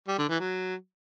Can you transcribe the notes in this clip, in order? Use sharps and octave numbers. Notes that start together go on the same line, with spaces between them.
G3
D3
E3
F#3